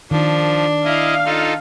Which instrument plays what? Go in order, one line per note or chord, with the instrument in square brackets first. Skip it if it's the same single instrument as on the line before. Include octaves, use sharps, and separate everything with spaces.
[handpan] D#3 [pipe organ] F3 [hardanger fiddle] D4
[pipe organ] E4 D#5 [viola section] F5
[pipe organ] D#4 F4 A4